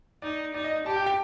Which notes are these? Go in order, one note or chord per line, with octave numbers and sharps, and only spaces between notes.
D#4 D5
D#4 D5
D#5
G4 A5
G5
G5